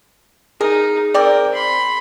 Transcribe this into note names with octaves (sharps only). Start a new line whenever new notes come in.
D#4 G#4 A#4
C4 A#4 D5 G5
B5 C6